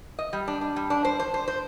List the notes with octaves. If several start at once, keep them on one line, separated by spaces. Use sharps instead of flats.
D#5
G3
D4
D4
G3
D4
C5
C5
C5
C5